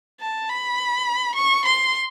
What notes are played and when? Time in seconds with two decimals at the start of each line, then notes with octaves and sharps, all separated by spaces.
0.21 A5
0.49 B5
1.35 C#6
1.65 C6